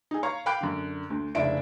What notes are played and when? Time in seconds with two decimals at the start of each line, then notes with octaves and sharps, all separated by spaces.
0.11 D#4 G#4
0.23 C#5 F5 A#5 C#6
0.46 F5 G5 B5 D6 F#6 D7
0.61 F#2 D3
1.10 D2
1.35 F1 C#3 D4 E4 E5 D7